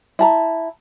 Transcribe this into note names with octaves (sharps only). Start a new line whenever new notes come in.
E4 A5 A#5